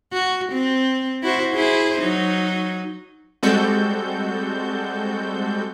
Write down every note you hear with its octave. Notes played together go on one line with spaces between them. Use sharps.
F#4
C4
E4 F#4 C5
E4 G#4 C5
F#3 D#4
G3 G#3 C4 F#4 A4 G6